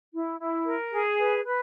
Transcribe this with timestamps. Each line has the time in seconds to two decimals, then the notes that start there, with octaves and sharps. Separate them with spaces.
0.12 E4
0.39 E4
0.65 A#4
0.92 G#4
1.18 B4
1.44 B4